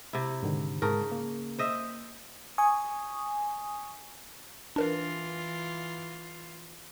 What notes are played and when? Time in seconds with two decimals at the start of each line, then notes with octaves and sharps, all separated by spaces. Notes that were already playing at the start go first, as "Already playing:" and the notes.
0.13 C3 E4
0.43 G#2 D3 D#3
0.82 G#2 C#3 A#4 A5
1.12 A#3
1.59 C5 D#5 E5
2.58 G#5 C#6 D#6
4.76 E3 D4 F4 A#4 B4